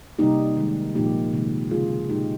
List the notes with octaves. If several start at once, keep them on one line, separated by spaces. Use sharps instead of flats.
C3 G3 A#3 D#4 G4
D#3 G#3
A#2 F3 A#3 D#4 G4
C3 D#3 G#3
C#3 G#3 F4 G#4
A#2 G#3 D#4 G4